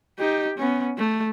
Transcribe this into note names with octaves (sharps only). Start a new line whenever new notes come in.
D#4 G4
B3 C#4
A3